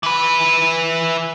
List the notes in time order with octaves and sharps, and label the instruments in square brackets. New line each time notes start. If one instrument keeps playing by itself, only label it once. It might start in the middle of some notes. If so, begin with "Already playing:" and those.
[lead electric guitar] E3 B4